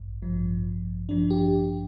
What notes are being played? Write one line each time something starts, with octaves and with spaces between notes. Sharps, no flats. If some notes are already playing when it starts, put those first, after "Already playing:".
Already playing: A1 G2
A1 G2 F3
A1 G2 F3 D4
G4